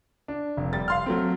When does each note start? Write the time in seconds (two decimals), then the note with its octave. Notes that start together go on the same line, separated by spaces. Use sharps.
0.28 D4
0.57 F1
0.73 G3 A6
0.88 F5 C6 F6
1.06 F#3 A3 C4